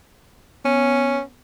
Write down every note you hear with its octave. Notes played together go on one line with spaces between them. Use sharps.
B3 C#4